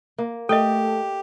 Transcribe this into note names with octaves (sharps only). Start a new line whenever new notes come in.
A#3
A3 G4 A4 D#5 G5